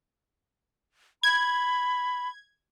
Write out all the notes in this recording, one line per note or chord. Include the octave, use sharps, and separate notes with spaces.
B5 G#6